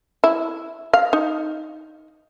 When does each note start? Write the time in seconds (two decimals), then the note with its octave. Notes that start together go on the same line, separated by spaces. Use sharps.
0.24 E4
0.93 F5
1.13 D#4